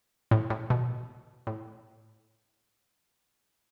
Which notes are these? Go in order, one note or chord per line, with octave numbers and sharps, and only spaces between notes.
A2
A2
B2
A2